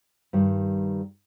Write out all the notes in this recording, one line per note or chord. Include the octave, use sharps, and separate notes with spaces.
G2 D#3 G3